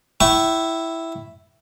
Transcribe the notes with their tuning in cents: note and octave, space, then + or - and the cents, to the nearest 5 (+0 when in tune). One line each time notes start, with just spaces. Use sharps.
E4 +0 G5 -30 C#6 +0